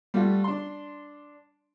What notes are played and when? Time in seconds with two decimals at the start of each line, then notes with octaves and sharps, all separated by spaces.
0.14 G3 A3 F4 F#4
0.44 D4 C6